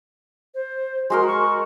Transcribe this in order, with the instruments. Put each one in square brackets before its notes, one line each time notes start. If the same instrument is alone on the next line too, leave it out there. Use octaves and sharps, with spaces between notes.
[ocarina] C5
[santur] G#3 F#4 A#4 [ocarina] C6
[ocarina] C#6